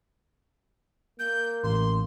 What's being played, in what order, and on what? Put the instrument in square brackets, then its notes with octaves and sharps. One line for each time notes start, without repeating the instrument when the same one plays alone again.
[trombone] A#3 [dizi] G6
[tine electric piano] A1 [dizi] C6